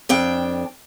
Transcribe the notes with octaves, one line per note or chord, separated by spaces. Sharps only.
F2 D4 G5